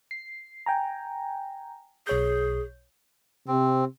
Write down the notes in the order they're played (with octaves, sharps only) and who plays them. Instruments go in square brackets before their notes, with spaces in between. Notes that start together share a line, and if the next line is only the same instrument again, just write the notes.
[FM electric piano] C7
G5 G#5 A#5
[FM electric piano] B1 C#5 G6 [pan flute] G#4
[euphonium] C3 [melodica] C4